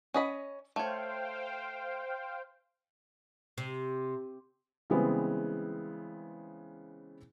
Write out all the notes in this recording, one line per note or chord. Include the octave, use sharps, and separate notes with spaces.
C#4 D#5 B5
A3 C5 C#5 F5 G5
C3
C#3 E3 G3 G#3 B3 C4